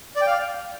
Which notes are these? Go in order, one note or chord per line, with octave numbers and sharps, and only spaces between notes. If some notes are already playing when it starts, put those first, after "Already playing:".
D5
G5
F5